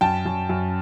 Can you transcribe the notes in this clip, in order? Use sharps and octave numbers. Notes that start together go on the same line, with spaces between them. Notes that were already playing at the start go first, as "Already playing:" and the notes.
F#2 G5 A5
F#2
F#2